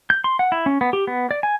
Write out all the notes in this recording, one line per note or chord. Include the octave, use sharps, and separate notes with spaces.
G6
C6
F#5
E4
C#4
B3
G4
B3
D5
G#5